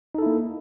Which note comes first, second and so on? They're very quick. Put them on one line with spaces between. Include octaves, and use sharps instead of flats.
D#4 A4 E4 A#3